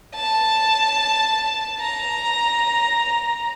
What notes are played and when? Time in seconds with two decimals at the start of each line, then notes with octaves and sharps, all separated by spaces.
0.16 A5
1.80 A#5